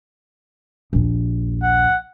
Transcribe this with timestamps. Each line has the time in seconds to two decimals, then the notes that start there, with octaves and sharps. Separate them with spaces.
0.93 A#1 D#2
1.63 F#5